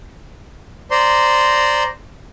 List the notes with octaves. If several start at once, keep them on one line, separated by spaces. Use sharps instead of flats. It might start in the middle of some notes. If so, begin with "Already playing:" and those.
C5 D5 A#5 C6